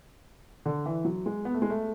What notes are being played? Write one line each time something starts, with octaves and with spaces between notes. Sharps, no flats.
D3
E3
F#3
G#3
B3
A3
G#3
A3